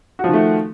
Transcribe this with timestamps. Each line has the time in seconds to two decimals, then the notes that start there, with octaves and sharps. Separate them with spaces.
0.19 F#4
0.24 F3
0.29 D#3
0.34 A3